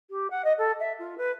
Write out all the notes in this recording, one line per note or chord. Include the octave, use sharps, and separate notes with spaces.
G4
F#5
D#5
A4
E5
F4
B4